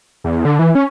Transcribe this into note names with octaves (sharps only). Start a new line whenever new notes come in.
E2
D3
E3
C#4